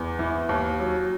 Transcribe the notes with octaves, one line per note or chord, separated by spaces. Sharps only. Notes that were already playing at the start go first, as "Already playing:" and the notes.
Already playing: E2
E3
D#2
F#3